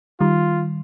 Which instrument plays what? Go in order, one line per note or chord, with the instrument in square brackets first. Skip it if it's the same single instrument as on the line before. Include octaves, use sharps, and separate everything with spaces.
[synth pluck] D#3 G3 [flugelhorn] F4